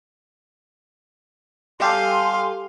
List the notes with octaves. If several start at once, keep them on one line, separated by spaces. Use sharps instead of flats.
G3 G4 A4 F5 G#5 C6